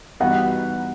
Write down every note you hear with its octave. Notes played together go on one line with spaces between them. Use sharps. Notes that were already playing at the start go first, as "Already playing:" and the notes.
E3 G3 B3 D#4 F#4 F#5